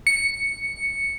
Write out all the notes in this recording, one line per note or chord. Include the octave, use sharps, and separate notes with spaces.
C#7